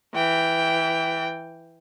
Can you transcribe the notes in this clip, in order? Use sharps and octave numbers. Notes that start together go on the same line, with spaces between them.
E3 G5